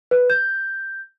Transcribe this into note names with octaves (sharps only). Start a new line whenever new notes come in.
B4
G6